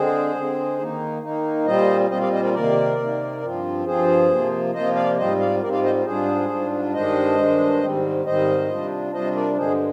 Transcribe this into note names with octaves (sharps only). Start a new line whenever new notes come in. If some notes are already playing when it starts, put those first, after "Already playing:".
Already playing: D3 G#3 C4 G#4 C5
D3 G#3 C4
D#3 A#3 D#4
D#3 A#3 D#4
A#2 G3 C4 F4 C5 D#5
A#2 G3 C4 F4 C5 D#5
D5 F5
C5 D#5
A#4 D5
C3 D#3 A#3 A#4 D5
C3 D#3 A#3
G2 F3 C4 F4
G2 F3 C4 F4 G#4 C5
C3 F3 A#3 F4
C3 F3 A#3 F4 C5 D#5
D5 F5
G#2 G3 C4 F4 C5 D#5
D5 F5
G#2 G3 C4 F4 A#4 D5
D5 F5
C5 D#5
G#2 G3 D4 F4 G#4 C5
G#2 G3 D4 F4
G2 D#3 G#3 D4 C5 D#5
G2 D#3 G#3 D4
G#2 D#3 G3 C4
G#2 D#3 G3 C4 C5 D#5
C3 G3 D4 F4
C3 G3 D4 F4 C5 D#5
A#4 D5
G2 D3 G#3 G#4 C5